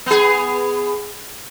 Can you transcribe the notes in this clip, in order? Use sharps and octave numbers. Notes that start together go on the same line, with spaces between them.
B3 G#4